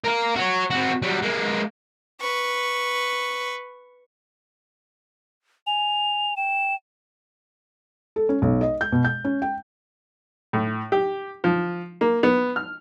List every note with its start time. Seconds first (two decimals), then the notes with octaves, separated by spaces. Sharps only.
0.04 A#4 F5
0.36 F#4 C#5
0.71 C4 F#4
1.02 F#3 G3
1.22 G#3 A#3
2.20 B4 C#6
5.67 G#5 F7
6.37 G5 E7
8.16 A4
8.29 C#4
8.42 B1
8.61 D#5
8.81 G6
8.92 B2
9.05 G6
9.25 C#4
9.42 G5
10.53 A2
10.92 G4
11.44 F3
12.01 A#3
12.23 B3
12.56 F6